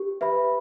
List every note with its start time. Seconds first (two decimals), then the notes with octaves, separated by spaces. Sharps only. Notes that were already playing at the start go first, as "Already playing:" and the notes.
Already playing: G4
0.21 B4 E5 B5